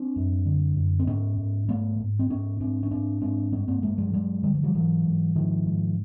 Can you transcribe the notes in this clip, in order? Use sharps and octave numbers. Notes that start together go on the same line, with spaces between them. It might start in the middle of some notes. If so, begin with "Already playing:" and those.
Already playing: C4 D4
F#2
D3
F#2
C4
G#2 B3 C#4
G#2
G#2 A3 B3
G#2
C4
G#2 B3 C#4
G#2 C4 D4
C#4
G#2 C4 D4
G#2 C4 D4
G2 B3 C#4
A#3 C4
G2 G#3 A#3
F#3 G#3
G2 F#3 G#3
D3 G3
F#3
F3 G3
G#2 E3 F#3
G#2
G#2 D#3 F3
G#2